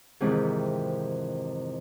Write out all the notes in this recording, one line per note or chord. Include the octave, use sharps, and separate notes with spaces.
F2 G#2 C3 D#3 E3